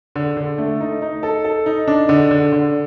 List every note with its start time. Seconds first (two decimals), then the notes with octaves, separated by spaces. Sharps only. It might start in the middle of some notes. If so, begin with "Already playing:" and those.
0.16 D3
0.37 D3
0.58 A3
0.81 D#4
1.02 D#4
1.23 A4
1.44 A4
1.66 D#4
1.88 D4
2.09 D3
2.31 D3
2.52 D3